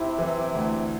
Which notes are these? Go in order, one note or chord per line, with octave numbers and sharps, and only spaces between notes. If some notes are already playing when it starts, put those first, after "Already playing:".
Already playing: C3 E4
E3
D2